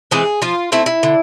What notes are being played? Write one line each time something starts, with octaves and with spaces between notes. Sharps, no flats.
E3 G#3 C4 G#4
F3 F4
A3 C4 E4
E4
D3